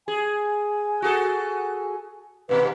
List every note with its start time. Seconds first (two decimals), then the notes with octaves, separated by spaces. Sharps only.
0.08 G#4 G#5
1.02 F#4 G#4 A4
2.49 D#2 G#2 B2 B4